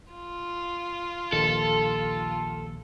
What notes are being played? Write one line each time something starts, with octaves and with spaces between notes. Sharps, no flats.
F4
A#1 D#2 A4